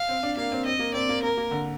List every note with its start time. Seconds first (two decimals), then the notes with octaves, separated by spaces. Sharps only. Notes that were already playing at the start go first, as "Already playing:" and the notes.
Already playing: F5
0.09 C4
0.23 D4
0.37 A#3 F5
0.52 C4
0.65 C4 D#5
0.79 A#3
0.94 C4 D5
1.09 A#3
1.23 A#3 A#4
1.37 A#3
1.51 D3